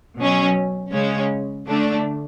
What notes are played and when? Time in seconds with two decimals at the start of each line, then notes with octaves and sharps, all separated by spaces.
0.18 B2 F#3 C#4
0.93 C#3 G#3 C#4
1.67 D3 A3 D4